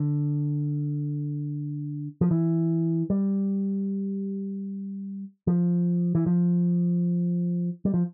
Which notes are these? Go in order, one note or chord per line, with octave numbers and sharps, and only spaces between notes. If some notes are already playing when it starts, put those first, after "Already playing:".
Already playing: D3
F3
E3
G3
F3
E3
F3
G3
F3